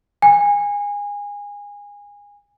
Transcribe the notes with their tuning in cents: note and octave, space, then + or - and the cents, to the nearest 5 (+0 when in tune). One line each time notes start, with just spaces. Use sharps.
G#5 -25